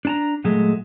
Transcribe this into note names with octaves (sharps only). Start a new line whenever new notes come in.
D4 A5 A#5
A#2 F#3 G#3 A3